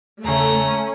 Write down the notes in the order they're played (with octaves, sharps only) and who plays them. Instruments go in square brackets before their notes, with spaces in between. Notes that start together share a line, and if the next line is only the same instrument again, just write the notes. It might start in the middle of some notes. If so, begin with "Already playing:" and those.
[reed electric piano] E2 C#3 [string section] A3 A4 [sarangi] C#4 [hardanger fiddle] A#5